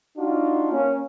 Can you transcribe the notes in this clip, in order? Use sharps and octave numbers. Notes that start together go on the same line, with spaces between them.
D4 D#4 F4 F#4
A#3 C#4